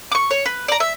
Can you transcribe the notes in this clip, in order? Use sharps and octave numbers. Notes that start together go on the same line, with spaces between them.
C#6 D6
C#5
B4
D5 A#5
E5